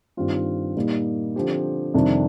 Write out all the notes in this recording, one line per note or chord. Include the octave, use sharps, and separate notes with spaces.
G2 D#3 G3 C4 F4
A#2 G3 A#3 D#4
D3 F3 C4 G4
F2 C3 D#3 G3 D4